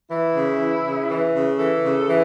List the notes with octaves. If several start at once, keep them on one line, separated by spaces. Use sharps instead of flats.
E3 E4
C#3
E3
C#3
E3
C#3
E3 A4
C#3
E3